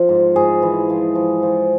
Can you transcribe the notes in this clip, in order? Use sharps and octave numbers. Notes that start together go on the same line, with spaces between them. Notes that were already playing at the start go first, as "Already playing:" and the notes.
Already playing: F3
G#2
G#2 G#4
E3
F3
F3
F3